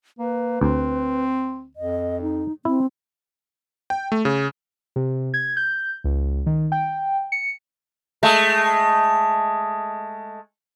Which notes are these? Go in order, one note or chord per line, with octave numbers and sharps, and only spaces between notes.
A#3 B4
D2 C4
F2 D#5
D#4
C4 E4
G5
A3
C#3
C3
G#6
G6
C#2
D#3
G5
C#7
G#3 A3